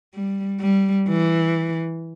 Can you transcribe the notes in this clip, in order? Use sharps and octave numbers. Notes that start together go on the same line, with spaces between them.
G3
G3
E3